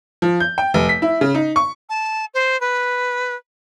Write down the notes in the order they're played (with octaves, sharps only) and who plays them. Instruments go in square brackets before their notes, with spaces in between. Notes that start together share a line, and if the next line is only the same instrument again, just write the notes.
[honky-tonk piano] F3
G6
G5
F1
B6
E4
C#3
D#4
C#6
[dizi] A5
C5
B4